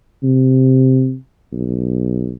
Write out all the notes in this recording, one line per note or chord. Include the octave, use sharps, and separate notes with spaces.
C3
B1